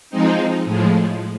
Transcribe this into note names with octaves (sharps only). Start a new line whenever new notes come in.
F3 G#3 C4 D#4
A2 F3 G#3